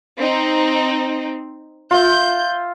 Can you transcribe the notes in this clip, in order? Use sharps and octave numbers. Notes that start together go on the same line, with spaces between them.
C4 D#4
F4 E5 G6